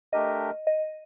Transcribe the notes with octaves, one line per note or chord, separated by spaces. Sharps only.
A3 D4 G4 A#4 D#5
D#5